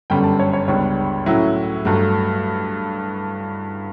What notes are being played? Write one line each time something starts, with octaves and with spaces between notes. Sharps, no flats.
G1 F#2 D3 G3 C#4 G5
A5
C#5
C#5
C#2 B2 G3 D4 C#5
A2 F#3 C#4 E4
G2 F#3 A3